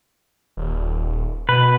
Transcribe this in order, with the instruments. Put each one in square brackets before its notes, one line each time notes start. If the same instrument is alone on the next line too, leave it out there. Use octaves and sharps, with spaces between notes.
[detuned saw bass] D#1
[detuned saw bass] B2 [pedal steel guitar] B4